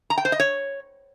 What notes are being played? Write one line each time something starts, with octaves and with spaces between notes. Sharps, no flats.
A#5
G5
C5
D#5
C#5